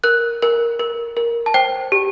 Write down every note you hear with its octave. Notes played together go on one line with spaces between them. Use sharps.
A#4 F#6
A#4
A#4
A#4
A5
C5 G5
G4